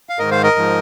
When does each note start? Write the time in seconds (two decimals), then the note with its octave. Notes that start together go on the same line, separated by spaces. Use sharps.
0.09 F5
0.19 G#2 D#3 A#4 D#5
0.31 C5 F5
0.43 A#4 D#5
0.56 G#2 F3